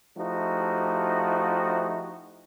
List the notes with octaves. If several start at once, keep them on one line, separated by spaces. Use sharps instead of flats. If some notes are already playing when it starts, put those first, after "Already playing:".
F3 A3 D#4 E4 F#4 G4